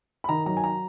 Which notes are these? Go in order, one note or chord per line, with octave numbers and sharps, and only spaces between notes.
B5
D#3 A#5
F#3 A#5
G#5
A#5